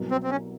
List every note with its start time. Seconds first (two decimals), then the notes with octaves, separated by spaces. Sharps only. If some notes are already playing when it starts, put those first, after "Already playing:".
Already playing: C2 B2 F#3
0.11 C4
0.23 C4
0.30 C#4